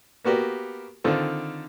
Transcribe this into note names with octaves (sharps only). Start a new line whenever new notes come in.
A#3 B3 F#4 G4 A#4
D3 D#3 C4 F4 A4